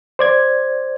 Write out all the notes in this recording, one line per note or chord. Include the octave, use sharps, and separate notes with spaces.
C5 D5 G#6